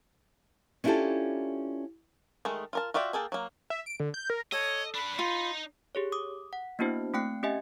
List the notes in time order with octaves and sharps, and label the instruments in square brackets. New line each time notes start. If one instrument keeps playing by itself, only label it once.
[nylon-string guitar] C#4 D4 E4 F4 G4 A4
[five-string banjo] D#3 G#3 A3
F4 A#4 A5
F4 F#4 D5 E5 G5
A#3 G#4 A4 G5
F#3 A#3
[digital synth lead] E5
D7
D3
G6
A#4
[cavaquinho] A4 [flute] C#5 [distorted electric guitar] D#5
[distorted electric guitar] D4 B4 [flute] B5
[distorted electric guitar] D#4 [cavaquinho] F4
[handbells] G4 G#4 C#5
D6 D#6
F#5
A#3 B3 D4 E4 F#4 C5
A3 C4 G5 F#6 C#7
C#4 G4 D#5 E5 G#5